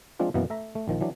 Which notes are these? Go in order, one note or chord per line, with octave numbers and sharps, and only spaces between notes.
F3 G#3 C4 D4 F4
F#2 B2 E3 A#3 B3
A3 E5 A#5
A3
A#1 D#3 F3
E3 F#3 D4